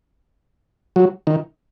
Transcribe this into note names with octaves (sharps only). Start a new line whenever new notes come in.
F#3
D#3